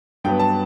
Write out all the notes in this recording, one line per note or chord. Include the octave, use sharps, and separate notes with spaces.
G2 F#3 B3 G5
A5